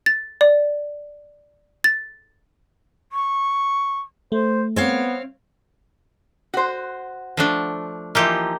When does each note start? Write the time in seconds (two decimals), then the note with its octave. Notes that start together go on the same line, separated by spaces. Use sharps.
0.06 A6
0.41 D5
1.84 A6
3.11 C#6
4.32 A3 C5
4.76 B3 C4 C#5 F5
6.54 F#4 C5
7.37 F3 A3 D4
8.15 E3 F3 A#3 D#4 G4